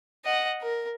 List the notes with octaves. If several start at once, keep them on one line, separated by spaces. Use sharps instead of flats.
D#5 F#5
A#4